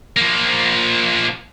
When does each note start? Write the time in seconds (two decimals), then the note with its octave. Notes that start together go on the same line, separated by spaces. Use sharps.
0.17 F3 A#3